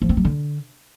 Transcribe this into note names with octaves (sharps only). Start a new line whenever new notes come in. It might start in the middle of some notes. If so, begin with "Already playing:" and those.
F3
C4
F#3
D3